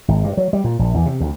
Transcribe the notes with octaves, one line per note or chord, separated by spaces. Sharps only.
G#1
G2
F#3
G3
A#2
A#1
E2
C3
D2